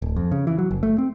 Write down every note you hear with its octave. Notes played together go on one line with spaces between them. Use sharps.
D1
F2
C#3
E3
F#3
F#1
A3
C4